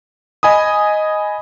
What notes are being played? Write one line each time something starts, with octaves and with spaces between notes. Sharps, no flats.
D#5 G#5 B5 D#6